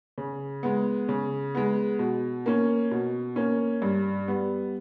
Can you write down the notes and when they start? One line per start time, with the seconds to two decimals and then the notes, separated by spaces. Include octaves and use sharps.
0.18 C#3
0.63 G#3 B3
1.09 C#3
1.55 G#3 B3
1.99 B2
2.46 A#3 C#4
2.91 B2
3.36 A#3 C#4
3.82 G2
4.28 G3 B3